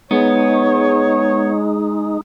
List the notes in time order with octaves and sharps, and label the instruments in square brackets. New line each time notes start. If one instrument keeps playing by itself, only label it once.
[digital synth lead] G#3 [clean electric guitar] B3 [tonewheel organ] D#4 [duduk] C#5